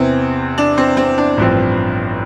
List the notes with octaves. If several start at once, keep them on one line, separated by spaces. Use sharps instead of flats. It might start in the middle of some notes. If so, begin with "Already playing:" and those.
Already playing: E2 C3 E3 C4
D4
C4
C4
D4
A1 G2 F3 C4